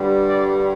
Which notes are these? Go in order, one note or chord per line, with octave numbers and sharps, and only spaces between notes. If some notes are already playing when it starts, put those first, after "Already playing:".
Already playing: G2 D3 G3
D5